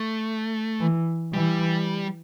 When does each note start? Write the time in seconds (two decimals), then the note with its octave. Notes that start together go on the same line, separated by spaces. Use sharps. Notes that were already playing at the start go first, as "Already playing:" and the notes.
Already playing: A3
0.81 E3
1.33 E3 G3